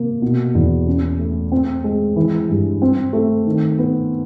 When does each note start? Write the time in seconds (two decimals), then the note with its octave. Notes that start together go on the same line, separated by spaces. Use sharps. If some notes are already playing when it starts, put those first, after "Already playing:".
Already playing: C3 A#3
0.22 B2
0.55 E2
0.87 C#4
1.19 A3
1.52 C4
1.84 G#3
2.16 E3
2.49 G2
2.82 C4
3.13 A3
3.46 D#3
3.79 B3